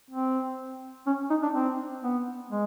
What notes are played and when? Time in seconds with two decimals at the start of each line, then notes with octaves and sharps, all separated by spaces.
0.11 C4
1.07 C#4
1.30 D#4
1.43 D4
1.54 C4
2.02 B3
2.51 G#3